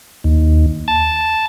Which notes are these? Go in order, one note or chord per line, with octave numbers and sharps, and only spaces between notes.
D#2
A5